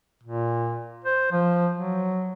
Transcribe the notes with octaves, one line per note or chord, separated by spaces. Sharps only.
A#2
C5
F3
F#3